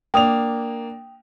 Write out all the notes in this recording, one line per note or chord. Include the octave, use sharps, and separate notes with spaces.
A#3 D4 G5 D#6 F7